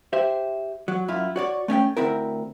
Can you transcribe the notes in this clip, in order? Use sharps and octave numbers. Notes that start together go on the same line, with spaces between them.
G4 C5 E5
F#3
F#2 E4 F4
F#4 C#5 D5
A3 C#4 E5 G5
D2 C4 E4 A#4